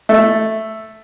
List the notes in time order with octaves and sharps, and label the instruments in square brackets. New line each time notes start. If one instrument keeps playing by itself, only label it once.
[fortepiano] A3